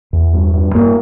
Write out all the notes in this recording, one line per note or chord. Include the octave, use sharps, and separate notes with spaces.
E2
G2
G2
G2 A#3